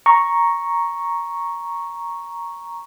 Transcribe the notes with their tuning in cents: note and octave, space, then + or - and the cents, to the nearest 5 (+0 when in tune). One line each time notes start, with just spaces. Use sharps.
A#5 +5 C#6 +0